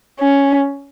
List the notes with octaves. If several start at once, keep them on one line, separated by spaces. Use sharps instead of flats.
C#4